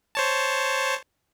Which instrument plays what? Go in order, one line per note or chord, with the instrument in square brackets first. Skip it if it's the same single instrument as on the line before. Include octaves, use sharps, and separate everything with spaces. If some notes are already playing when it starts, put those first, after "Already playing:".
[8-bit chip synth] C5 C#5 A5